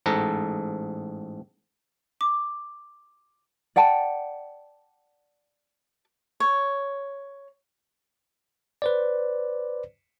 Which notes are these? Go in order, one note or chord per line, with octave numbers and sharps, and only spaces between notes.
A1 G#2 A4 A#5
D6
D5 F#5 G5 A5
C#5
B4 C5 D5